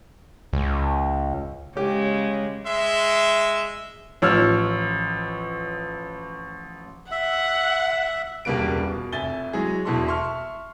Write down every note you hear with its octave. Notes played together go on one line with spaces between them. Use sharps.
C#2
C#3 G#3 G4 C#5
G#3 E5 C6
A1 F3 C#5 E6 F6
E5 F#5
E1 C#2 G3 A#3 B4 D7
B2
F1 E5 G#5 A6 G7
F#3 G#3 E4 G#4
E1 B2 E4 A4 C6
E5 A5 C6 C#6 F6